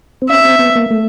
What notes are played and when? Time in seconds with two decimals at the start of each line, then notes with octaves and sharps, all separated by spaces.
0.22 C4
0.29 C#4 E5
0.45 C4
0.59 B3
0.75 A#3
0.90 A3